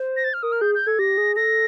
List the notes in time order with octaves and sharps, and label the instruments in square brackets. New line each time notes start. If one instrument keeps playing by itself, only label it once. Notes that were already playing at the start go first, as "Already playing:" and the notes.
Already playing: [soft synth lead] C5
[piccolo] A#6
A6
F6
[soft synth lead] A#4 [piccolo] D#6
[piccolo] F6
[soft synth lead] G#4 [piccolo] G6
[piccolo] G6
[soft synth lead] A4 [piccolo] G#6
[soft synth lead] G4 [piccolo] A#6
[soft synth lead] G#4
[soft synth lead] A4 [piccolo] A#6